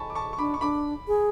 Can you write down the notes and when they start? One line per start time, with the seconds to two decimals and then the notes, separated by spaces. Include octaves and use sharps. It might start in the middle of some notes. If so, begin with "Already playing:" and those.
Already playing: G#5 A5 B5 C#6
0.10 D6
0.15 A5 C#6
0.33 C#6
0.38 D4 B5 D6
0.54 C#6
0.61 D4 B5 D6
1.08 G#4